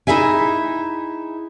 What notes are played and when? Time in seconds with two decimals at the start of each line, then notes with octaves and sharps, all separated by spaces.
0.07 D#4 E4 G#4 E5 G#5